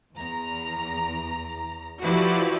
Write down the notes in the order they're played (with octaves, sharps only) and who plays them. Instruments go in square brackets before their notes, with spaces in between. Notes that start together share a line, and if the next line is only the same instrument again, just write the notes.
[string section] E2 A#5
F3 E4 F#4 G4 B4 D5